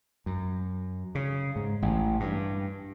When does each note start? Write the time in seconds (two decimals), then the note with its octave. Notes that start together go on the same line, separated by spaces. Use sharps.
0.26 F#2
1.15 C#3
1.56 G#2
1.82 A1
2.20 G2